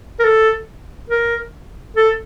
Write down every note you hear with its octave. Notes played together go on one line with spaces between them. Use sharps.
A#4
A4
A#4
A4